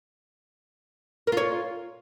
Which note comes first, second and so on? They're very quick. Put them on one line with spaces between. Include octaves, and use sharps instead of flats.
A#4 F4 C#5